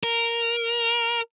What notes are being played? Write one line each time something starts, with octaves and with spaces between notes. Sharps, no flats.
A#4